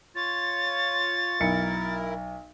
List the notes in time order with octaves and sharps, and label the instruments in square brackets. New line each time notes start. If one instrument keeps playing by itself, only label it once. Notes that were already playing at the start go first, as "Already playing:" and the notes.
[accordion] F4 C#5 [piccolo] A6
[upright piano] B1 C#7 [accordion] E4 A#4